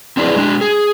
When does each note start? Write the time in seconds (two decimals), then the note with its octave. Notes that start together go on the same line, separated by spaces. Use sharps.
0.17 C4 D4 E4 G4 G#4 B4
0.36 G#3 D4
0.61 G#4